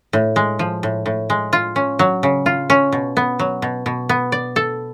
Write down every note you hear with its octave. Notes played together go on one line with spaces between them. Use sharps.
A2
G#3
F3
A2
A2
G#3
F4
C#4
F#3
C#3
F4
C#4
B2
B3
F#3
B2
B2
B3
D5
A4